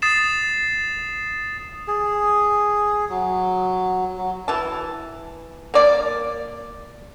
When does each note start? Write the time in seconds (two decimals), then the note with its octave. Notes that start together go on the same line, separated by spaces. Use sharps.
0.02 D#6 A6 C7 E7
1.88 G#4
3.09 F#3
4.18 F#3
4.48 E3 A5
5.74 A#3 D5